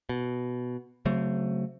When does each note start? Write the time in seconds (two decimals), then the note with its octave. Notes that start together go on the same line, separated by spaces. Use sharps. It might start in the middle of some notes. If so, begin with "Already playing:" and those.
0.09 B2
1.05 C#3 F#3 A3 C4